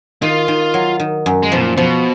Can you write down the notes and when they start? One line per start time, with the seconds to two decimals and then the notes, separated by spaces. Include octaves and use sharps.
0.22 D#3 F4
0.48 D#3
0.74 F#3
1.00 D#3
1.26 F#2
1.43 G#3
1.52 B2 F3
1.61 A#2
1.77 B2 F3